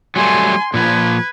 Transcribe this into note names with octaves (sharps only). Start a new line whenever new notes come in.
F#3 G3 A3 G#5 C6
A#2 F3 B4 G#6